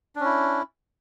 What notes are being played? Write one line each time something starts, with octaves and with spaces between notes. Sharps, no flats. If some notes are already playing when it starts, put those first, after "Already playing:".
C#4 D4 E4